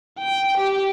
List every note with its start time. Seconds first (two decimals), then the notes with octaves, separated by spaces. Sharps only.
0.19 G5
0.57 G4